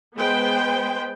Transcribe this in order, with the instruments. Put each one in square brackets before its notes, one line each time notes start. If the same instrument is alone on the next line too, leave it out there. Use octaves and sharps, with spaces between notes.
[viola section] G#3 B3 B4 C5 G5